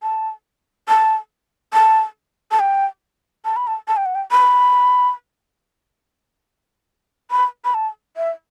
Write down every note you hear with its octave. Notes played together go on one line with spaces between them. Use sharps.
A5
A5
A5
A5
G5
A5
B5
A5
A5
G5
F#5
G5
B5
B5
B5
A5
E5